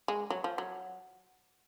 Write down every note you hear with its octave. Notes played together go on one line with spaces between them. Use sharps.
G#3
F#3
F3
F#3